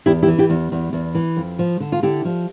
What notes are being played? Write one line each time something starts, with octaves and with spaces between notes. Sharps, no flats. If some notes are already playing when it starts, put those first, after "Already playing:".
E2 E4 G4
E4 G4
E3
E4 G4
E2
E2
E2
E3
F2
F3
D3
F4
D3 E4 G4
F3